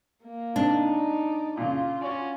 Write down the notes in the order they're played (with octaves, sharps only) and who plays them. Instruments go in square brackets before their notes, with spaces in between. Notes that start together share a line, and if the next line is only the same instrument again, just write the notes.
[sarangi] A#3
[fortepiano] C3 [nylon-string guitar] D4 [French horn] D#4
[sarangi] D5
[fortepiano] A#2 C#3 [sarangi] F4
[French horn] C#4 [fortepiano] F#4 D5